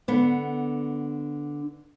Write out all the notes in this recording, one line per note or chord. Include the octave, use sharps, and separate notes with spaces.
D3 B3